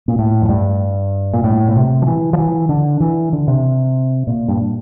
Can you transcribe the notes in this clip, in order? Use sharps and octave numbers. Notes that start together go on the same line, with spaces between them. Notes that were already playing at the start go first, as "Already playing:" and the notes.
A#2
A2
F2
G2
A#2
A2
A#2
C3
F3
E3
F3
E3
D3
E3
D3
C3
A#2
G2